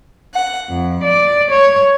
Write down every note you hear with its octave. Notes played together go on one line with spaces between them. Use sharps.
F#5
F2
D5
C#5